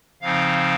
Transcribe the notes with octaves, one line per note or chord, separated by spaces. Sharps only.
C#3 F3 C4 D#4 F5